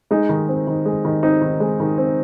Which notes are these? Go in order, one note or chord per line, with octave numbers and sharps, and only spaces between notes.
G#3 D#4
D#3
C4
D#3
G#3
D#3
C4 D#4
D#3
G#3
D#3
C4